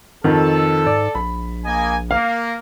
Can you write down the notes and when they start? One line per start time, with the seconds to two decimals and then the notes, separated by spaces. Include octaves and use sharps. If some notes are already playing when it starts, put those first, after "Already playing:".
0.24 F2 D#3 A4
0.86 G#2 D5
1.15 A#1 B5
1.64 A#3 D#5 G#5
2.11 A#3 F5